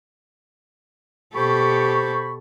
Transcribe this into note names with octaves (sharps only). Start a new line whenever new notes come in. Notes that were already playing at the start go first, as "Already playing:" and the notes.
B2 G4 A4 C5 B5 C#6